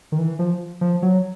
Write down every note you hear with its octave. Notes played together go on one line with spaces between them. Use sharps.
D#3
E3
F3
F3
F#3